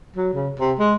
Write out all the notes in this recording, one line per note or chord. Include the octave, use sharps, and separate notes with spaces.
F#3
C#3
C3
G#3